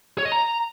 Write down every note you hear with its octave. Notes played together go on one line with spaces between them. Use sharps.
C#5
D#5
A#5